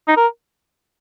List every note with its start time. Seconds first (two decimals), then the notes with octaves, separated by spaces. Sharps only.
0.08 D#4
0.17 A#4